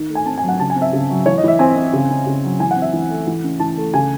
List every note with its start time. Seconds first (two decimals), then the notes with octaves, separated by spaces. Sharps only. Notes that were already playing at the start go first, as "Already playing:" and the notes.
Already playing: D#3
0.09 A3
0.15 G#5
0.26 C4 A5
0.38 G#5
0.43 F#3
0.48 F#5
0.59 C#3 A5
0.70 G#5
0.75 C4
0.82 E5
0.93 C#3
1.10 F#3
1.26 E3 C#5
1.38 D#5
1.43 E3 E5
1.59 C4 G#5
1.76 C4
1.93 C#3
2.10 C#4
2.27 C#3
2.44 F#3
2.60 E3 G#5
2.71 F#5
2.76 C4
2.82 E5
2.93 E3
3.10 A3
3.27 E3
3.44 C#4
3.60 E3 A5
3.77 A3
3.94 C#3 G#5